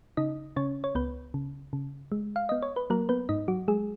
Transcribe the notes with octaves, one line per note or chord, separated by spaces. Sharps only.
C#3 D#4 D#5
C#3 C#4 C#5
C#5
C#2 B3 B4
C#3
C#3
G#3
F5
B3 D#5
C#5
B4
F#3 A#3 A#4
B3 B4
G#2 D#4 D#5
F#3 F#4
F#3 G#3 G#4